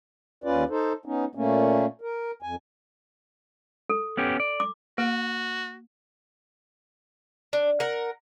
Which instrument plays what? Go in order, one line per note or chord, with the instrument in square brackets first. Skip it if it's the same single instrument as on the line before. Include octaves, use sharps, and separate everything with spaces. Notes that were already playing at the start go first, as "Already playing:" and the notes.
[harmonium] D#2 C#4 F4 B4 D5
D#4 A4 C5
B3 C#4 D#4
A#2 A3 A#3 C#4
A#4
F2 G#5
[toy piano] A4
[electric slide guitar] B3 C#4 G4
D5
[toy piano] D6
[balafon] A#3 [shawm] F#4
[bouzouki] D4
A#4 F#5